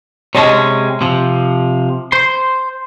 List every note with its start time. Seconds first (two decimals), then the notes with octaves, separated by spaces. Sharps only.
0.35 C3 G#3 C#4 C#5 D#5 A5
1.01 C3 F3
2.12 C5 C6